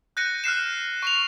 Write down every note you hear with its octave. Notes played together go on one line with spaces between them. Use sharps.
F#6 G6 A#6 C#7 D#7
F6 F#6 C7 E7
C#6 C7 F7